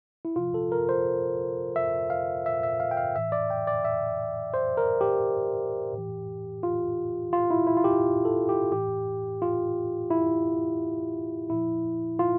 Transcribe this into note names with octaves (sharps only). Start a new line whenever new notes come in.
E4
C3 F3 F4
A4
A#4
C5
E5
F5
E5
E5
F5
G5
F5
A2 E3 E5
D5
G5
D5
E5
C5
A#4
G4
A2
E3
F4
F4
E4
E4
F4
G4
A4
G4
A2 E3 G4
F4
E4
A#2 F3 E4
F4